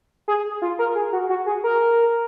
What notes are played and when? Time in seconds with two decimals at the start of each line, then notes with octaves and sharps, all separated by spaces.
0.28 G#4
0.62 F4
0.79 A#4
0.95 G#4
1.13 F#4
1.29 F#4
1.46 G#4
1.64 A#4